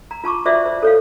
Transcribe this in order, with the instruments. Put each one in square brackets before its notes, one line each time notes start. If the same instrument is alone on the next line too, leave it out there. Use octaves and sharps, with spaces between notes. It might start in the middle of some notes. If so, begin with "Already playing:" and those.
[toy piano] A#5
F4 A5 C#6 D6
F4 F#4 C5 D5 E5 D6
C5
A4 C#5 F5